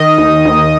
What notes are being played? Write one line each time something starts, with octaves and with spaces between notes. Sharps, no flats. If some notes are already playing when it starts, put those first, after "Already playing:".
Already playing: D#3 D#5
D#2
D#2